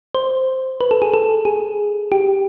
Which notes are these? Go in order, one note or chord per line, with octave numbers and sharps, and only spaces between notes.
C5
B4
A4
G#4
A4
G#4
G4